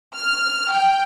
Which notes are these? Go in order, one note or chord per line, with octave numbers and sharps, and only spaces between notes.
F6
G5